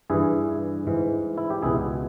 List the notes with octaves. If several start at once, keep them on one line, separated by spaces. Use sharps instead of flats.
G2 E3 E4 G#4
G#2 E3
E4
G4
C#2 B2 E4 G#4